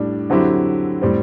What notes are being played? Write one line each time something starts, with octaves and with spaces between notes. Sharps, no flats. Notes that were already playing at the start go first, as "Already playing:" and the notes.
Already playing: A2 G3 D4
D3 F#3 C4 E4 G4
A2 G3 C4